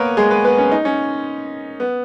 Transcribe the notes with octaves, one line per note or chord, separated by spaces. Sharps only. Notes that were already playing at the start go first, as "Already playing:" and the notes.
Already playing: A#3 B3 A#4 B4 C#5
G#3 G#4
B3 B4
B3 B4
C#4
D#4
C#4
B3